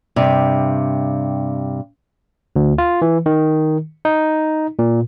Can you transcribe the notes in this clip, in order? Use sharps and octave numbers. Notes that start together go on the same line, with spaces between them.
G2 C3
D2
F4
E3
D#3
D#4
A#2